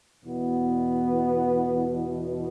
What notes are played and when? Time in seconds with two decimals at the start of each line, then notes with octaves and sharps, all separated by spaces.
0.24 E2 B2 B3